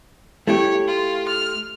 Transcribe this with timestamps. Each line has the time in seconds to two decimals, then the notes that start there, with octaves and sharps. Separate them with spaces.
0.47 A3 E4 G4 C#5
0.88 F4
1.28 F6